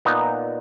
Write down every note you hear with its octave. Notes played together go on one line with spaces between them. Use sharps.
A#2 B3 D#4